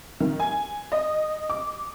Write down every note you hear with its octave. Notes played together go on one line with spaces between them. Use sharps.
D#3
G#5
D#5
D6